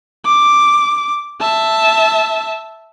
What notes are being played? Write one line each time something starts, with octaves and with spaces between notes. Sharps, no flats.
D6
E5 A5